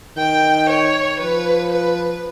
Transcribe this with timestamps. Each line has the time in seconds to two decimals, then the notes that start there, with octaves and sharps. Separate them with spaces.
0.17 D#3 G5
0.70 C#5
1.20 F3 B4
1.72 B4